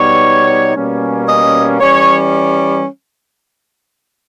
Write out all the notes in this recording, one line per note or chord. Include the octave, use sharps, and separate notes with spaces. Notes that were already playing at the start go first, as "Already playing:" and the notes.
Already playing: B2 G3 B3 D#4 C#5
B2 G3 A#3 C#4
D#5
E3 G3 C#4 C#5